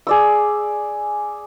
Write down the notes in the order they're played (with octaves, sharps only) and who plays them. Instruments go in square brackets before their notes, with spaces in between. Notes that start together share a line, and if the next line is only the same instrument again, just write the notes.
[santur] G#4 D5 E6